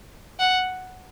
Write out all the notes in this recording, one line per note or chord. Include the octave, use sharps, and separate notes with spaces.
F#5